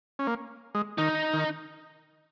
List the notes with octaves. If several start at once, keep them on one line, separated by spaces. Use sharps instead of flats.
C#4
A#3
G#3
D#3 D#4
D#3